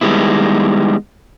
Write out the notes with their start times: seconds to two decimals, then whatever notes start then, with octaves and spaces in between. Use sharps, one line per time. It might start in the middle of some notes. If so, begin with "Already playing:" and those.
0.01 D#3 G3 G#3 B3 E4